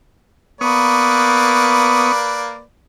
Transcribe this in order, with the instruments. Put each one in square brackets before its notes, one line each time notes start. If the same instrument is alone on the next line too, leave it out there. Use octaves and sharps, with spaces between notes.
[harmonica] A#3 B4 D5 [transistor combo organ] B3 C#6 D#6